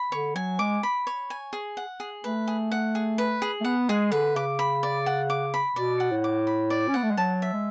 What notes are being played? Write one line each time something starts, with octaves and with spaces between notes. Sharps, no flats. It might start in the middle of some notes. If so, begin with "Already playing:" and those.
Already playing: B5
D3 C#5
F#3 G#5
G#3 D6
B5
C#5
G#5
G#4
F#5
G#4
A3 B4
G#4
F#5
G#4
B4
G#4
A3
B3 F#5
G#3 G#4
D3 B4
C#3 D6
B5
D5
F#5
D6
B5
B2 D5
F#5
A2
D6
B5
D5
C#4
B3 F#5
A3
G#3
F#3 A5
E5
G#3